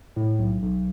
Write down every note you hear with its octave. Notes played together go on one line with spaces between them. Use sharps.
A2
B1
B1